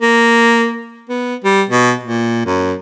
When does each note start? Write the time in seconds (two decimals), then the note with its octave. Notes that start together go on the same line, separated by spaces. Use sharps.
0.01 A#3
1.09 B3
1.44 G3
1.69 B2
2.03 A#2
2.46 F#2